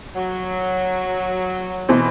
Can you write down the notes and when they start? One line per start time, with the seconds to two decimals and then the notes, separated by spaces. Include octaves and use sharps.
0.16 F#3
1.89 B2 E3 C4